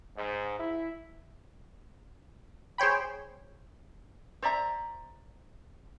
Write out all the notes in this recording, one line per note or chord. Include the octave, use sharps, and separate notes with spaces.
G#2
E4
G#4 C5 C#5 G5 B5
C5 D5 E5 A#5